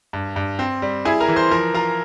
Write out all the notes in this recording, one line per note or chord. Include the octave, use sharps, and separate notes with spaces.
G2
G2
C4
G3
E4 G#4 G#5
A#4 A#5
E3
C5 C6
F3 A#4 A#5
F4 A#4 A#5